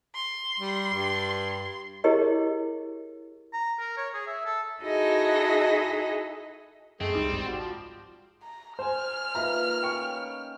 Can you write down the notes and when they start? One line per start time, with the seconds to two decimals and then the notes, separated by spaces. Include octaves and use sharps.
0.15 C6
0.59 G3
0.94 G2
2.04 E4 G4 G#4 A#4 C#5 D#5
3.53 A#5
3.79 A#4
3.97 C#5
4.14 G#4
4.27 E5
4.45 A4
4.83 D#4 E4 F#4 G#4 A4 D#5
7.01 F#2 G#3 A3 C4 G#4
7.14 C#2 G3 D#4 D#6
7.32 A1 G#2
7.46 F#4
7.59 F3
8.43 A#5
8.79 C5 G#5 F6
9.35 A#3 D#4 F4 B4 E5 A#5
9.83 C#4 G5 C#6 C#7